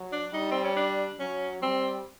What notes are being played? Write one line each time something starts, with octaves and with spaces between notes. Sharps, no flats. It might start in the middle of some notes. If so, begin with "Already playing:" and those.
Already playing: F#3
D4
G3 D#4
C4
C#4
D4
F#3 C#4
G3 C4